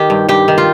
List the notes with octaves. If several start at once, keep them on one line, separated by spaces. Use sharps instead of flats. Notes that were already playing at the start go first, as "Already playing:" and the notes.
Already playing: D#3 D#4 G4
G2
G2 G4
D#3
F4